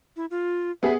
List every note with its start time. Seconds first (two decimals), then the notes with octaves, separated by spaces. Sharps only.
0.16 E4
0.31 F4
0.83 B3 G#4 B4 E5